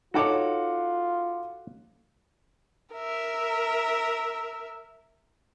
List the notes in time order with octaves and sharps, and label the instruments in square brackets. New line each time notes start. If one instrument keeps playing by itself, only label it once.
[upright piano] D#4 F#5 D6 [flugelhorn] F4 [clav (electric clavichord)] F#4 A4 C#5
[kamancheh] A#4 E5